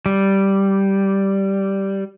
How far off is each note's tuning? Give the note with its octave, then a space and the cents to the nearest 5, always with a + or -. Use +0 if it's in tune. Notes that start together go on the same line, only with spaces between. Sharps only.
G3 -5